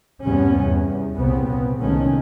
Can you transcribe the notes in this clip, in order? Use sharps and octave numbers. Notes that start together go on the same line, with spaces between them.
E2 G2 C3 G3 B3 C#4
E2
C2 A#2 C#3 B3 C4
C2 A#2 D#3 G#3 A3 C#4